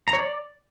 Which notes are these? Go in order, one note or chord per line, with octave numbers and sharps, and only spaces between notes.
A#5
C#5
D5